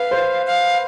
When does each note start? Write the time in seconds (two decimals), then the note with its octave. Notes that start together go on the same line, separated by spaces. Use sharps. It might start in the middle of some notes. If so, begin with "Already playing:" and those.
Already playing: B4 F5
0.11 C5
0.46 F5